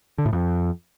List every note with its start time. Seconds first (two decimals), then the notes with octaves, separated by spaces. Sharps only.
0.18 D3
0.26 A2
0.33 F2